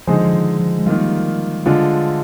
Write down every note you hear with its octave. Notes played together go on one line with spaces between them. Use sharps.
D3 F3 G#3 D#4 G#4 C5
F3
D#3
F3
G#3
D#3 G3 A#3 F4
D3 F3 G#3 D4 F4